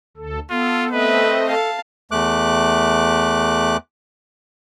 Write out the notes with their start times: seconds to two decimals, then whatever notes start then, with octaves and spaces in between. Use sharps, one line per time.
0.17 D2 A4
0.50 B3 F4 A4
0.91 A3 C4 A4 B4 D#5 E5
1.48 A4 F5 A5
2.11 E2 A3 D6 F#6